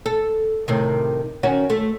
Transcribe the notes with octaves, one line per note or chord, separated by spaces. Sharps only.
A4
A2 C3 D#3
D#3 C#4 F#4
A3